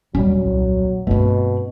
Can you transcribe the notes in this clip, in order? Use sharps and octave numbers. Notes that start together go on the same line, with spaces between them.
D#1 F#3 G3 B3 C#4
C2
G2 B2 A3 C4